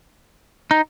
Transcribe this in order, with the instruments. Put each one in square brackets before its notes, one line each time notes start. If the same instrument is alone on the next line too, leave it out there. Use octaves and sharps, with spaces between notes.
[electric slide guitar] D#4